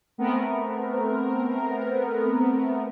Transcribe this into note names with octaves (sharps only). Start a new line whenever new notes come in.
A3 B3 C4 A#4